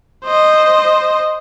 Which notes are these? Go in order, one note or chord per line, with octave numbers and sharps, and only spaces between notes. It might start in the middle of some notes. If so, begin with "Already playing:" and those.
C5 D#5